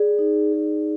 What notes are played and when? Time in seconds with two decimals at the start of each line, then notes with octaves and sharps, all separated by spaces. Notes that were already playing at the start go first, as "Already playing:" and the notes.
Already playing: G#4 D5
0.19 D#4
0.53 G#4